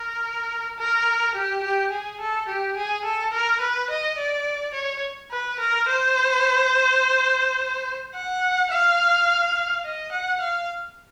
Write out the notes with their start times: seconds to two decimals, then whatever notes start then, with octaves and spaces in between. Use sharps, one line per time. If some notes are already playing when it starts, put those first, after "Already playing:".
Already playing: A#4
0.78 A#4
1.35 G4
1.63 G4
1.91 G#4
2.20 A4
2.48 G4
2.76 G#4
3.05 A4
3.33 A#4
3.61 B4
3.90 D#5
4.18 D5
4.74 C#5
5.31 B4
5.59 A#4
5.88 C5
8.14 F#5
8.70 F5
9.84 D#5
10.12 F#5
10.41 F5